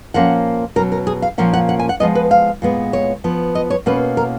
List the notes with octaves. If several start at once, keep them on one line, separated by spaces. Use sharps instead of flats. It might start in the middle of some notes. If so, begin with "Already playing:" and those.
A#2 F3 A#3 C#4 F#5
B2 F#3 C#4 A#4
A#4
G#4
F5
A#2 F3 A#3 C#4 F#5
F#5
F#5
G#5
F#5
F3 G#3 B3 D#5
B4
F5
A#2 G#3 B3
C#5
F3 B3
D#5
C#5
B2 A#3 C#4 B4
A#4